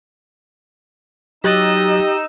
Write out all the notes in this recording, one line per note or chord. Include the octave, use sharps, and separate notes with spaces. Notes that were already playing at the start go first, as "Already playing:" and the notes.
F#3 D#4 G4 D#5 E6 F#6 A6